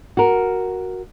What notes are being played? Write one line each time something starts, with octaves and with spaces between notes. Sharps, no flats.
F#4 A#4